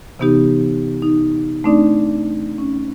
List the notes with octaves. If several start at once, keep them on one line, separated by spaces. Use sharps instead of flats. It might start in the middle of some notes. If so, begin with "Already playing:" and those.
C3 E3 B3 D#4 G4
D#4
A3 C4 D4 D#4 D5
C#4